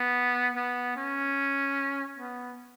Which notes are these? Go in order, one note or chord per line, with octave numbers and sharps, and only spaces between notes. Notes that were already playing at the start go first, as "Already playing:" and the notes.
Already playing: B3
B3
C#4
B3